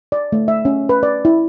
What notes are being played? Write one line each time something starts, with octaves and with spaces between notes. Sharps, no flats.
D5
A3
E5
C#4
B4
D5
E4